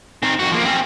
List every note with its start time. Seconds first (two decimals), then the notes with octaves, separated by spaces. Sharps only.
0.23 D#3 C4
0.40 F2 F#4
0.52 F3 A#3
0.66 C4 C#4